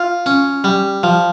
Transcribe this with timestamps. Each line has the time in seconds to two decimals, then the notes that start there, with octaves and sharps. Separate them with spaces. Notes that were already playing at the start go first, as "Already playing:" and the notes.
Already playing: F4
0.26 C#4
0.64 G3
1.03 F3